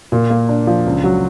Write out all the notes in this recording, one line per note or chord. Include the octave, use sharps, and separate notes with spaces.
A#2
A#3
D4
F3
C#2
F#3